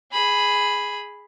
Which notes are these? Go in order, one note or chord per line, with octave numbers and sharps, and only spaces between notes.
G#4 B5